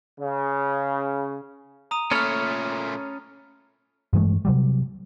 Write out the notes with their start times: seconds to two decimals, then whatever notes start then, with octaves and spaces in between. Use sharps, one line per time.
0.19 C#3
1.91 A#5 D#6 D#7
2.11 A#2 A3 C#4 A4 C#5 B5 F6
4.13 G2 E3 G#3 A3
4.45 C3 F#3 G3